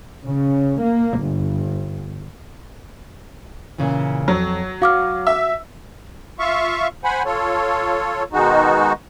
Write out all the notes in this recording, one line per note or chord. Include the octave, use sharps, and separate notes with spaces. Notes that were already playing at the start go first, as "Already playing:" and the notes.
C#3
A#3
G1
A#2 C#3 E3
F2 F#3
F#4 F5 D6 F6
E5
F4 E5 F5 C#6
C5 F#5 G#5 B5
F4 A4 C#5
B2 D#3 G#3 D#4 F#4